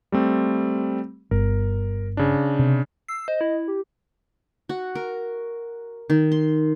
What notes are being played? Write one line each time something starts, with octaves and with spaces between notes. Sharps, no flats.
G3 A3 C4
G1 A#4
C#3 D4
C3
E6 C7
C5 D#5
E4
G4
F#4
A#4
D#3
C6